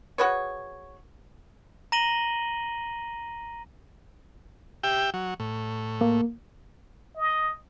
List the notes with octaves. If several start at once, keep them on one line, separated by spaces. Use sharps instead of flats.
F#4 G#4 B4 C#5
A#5 A#6 D#7 F#7 G7
G4 E5 G5
F#3
A2
A#3
D#5